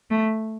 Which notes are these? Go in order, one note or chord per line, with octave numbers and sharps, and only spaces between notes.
A3